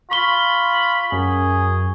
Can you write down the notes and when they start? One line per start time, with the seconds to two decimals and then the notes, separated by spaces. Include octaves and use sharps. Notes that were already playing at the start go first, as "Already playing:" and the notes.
0.11 F4 B5 C#6 G7
1.12 F#2 G#4